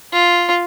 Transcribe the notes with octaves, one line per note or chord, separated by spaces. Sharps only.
F4